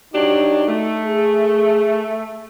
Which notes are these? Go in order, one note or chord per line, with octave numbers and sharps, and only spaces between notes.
F#3 D4 D#4 G4
A3
G#4